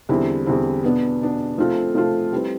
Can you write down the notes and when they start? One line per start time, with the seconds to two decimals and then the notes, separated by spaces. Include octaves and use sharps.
0.09 E2 D3 G3 C4 E4
0.46 E2 D3 G3 C4 E4
0.83 B2 B3 D4
1.21 B2 B3 D4
1.58 F3 A3 C4 F4 A4
1.95 F3 A3 C4 F4 A4
2.32 G3 C4 E4 B4